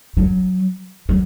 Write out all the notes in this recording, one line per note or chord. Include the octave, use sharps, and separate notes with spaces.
F#3
F#3